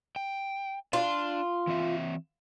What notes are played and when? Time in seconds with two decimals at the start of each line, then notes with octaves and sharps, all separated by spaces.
0.16 G5
0.93 D4 F4
1.67 E3 C4 E5